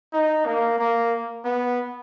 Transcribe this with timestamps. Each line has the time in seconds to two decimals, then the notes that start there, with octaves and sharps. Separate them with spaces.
0.13 D#4
0.46 A#3
0.79 A#3
1.45 B3